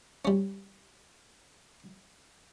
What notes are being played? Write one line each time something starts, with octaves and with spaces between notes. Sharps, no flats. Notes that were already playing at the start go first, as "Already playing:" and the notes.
G3 C#4